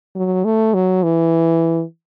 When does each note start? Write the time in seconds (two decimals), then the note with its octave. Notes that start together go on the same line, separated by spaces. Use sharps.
0.16 F#3
0.45 A3
0.74 F#3
1.03 E3